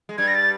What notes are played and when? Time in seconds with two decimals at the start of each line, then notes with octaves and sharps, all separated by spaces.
0.09 G#3
0.18 G2 G3 G#6
0.28 A#6
0.35 A6